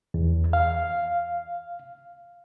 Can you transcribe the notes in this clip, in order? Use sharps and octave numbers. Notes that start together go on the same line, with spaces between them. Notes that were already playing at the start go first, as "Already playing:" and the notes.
E2
F5